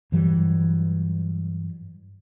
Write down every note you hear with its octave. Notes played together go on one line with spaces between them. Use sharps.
G2 E3 F#3 G3